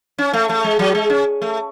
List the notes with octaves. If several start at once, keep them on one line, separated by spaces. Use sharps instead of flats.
C#4
A3
A3
G#3
F#3
G#3
C#4
A3